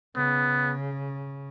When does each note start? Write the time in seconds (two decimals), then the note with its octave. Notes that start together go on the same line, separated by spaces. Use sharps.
0.16 C#3 B3